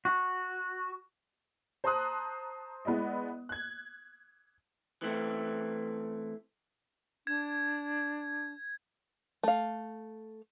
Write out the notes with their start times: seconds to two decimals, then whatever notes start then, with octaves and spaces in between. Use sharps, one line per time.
0.05 F#4
1.84 C5 A5 A#5 C6 D#6 F#6
2.85 G#3 B3 E4 D5 D#5
3.49 F#6 G#6
5.02 E3 A3 C4
7.27 D4 G#6
9.43 A3 F5